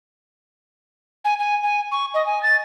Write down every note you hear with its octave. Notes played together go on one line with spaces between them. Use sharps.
G#5
G#5
G#5
C#6
D#5
G#5
A6